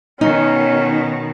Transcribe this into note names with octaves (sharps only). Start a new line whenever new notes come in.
B2 D#3 C#4 D#4